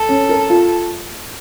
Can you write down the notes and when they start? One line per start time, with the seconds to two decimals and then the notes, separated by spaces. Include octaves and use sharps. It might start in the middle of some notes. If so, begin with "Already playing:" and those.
Already playing: A4
0.09 C#4
0.29 A#4
0.50 F4